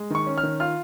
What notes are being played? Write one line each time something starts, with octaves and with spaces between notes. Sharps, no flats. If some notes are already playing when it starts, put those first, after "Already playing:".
Already playing: G#3
D#3 C#6
C#4
F6
D#3
F4 F6